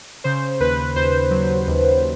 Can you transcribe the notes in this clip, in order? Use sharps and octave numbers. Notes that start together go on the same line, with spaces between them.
C#3 C5
D#2 B4
D#2 C5
F#3
D#2